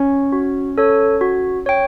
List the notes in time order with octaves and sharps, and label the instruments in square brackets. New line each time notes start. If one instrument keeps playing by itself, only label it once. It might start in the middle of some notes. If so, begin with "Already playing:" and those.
Already playing: [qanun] C#4
[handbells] F#4
A4 C#5
F#4
C#5 G5